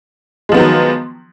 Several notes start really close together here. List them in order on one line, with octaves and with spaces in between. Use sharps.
G#3 F3 B3 D#3 F#3